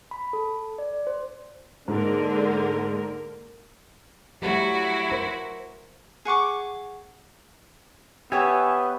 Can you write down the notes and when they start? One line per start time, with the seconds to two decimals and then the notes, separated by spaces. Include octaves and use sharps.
0.11 B5
0.33 A4
0.79 D5
1.07 C5
1.88 G#2 D3 A#3 A#4
4.42 F#3 G3 A3 E4 F#4
5.11 A#4 C5
6.25 G#4 F#5 C#6 D6
8.32 B3 G4 C#5 E5 G#5